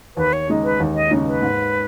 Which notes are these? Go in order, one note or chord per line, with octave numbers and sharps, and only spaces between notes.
D#2 B4
C#5
C#3 G#3 D#4
B4
D#2
D#5
C#3 G#3 D#4
B4
G#2